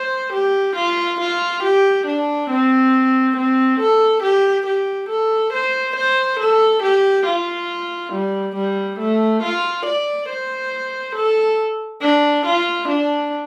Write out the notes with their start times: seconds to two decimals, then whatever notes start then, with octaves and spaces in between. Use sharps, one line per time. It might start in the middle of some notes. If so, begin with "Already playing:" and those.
Already playing: C5
0.33 G4
0.76 F4
1.20 F4
1.63 G4
2.07 D4
2.50 C4
3.37 C4
3.80 A4
4.23 G4
4.66 G4
5.09 A4
5.53 C5
5.96 C5
6.39 A4
6.83 G4
7.26 F4
8.13 G3
8.55 G3
8.99 A3
9.43 F4
9.86 D5
10.29 C5
11.16 A4
12.02 D4
12.46 F4
12.88 D4